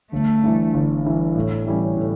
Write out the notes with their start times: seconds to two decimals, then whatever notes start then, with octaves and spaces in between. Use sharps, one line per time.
0.12 G1 A3
0.43 G2 E3
0.74 G1
1.05 G2 E3
1.35 A2
1.66 E3 G3 C#4
1.97 A2